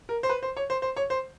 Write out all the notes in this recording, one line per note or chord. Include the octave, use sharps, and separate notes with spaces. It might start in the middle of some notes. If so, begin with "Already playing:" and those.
A#4
C5
B4
C5
C#5
C5
C5
C#5
C5